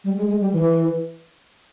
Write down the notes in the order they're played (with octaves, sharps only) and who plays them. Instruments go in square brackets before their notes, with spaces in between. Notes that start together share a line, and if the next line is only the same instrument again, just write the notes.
[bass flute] G3
G#3
G#3
G3
E3